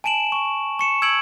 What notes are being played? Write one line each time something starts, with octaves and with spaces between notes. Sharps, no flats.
G#5 A5 D7 E7 F#7
C#6
C#6 C#7 E7
E6 G#6 C#7 D7 F#7